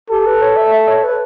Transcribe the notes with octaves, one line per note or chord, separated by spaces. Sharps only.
G4 A4
B4
C#5
E5
E5
C#5
B4